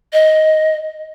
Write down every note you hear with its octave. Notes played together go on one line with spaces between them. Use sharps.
D#5